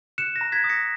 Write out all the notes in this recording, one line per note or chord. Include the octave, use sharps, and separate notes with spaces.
F#6 C#7 E7
A#6
A#5
G#6 B6
D#6
A#6 C#7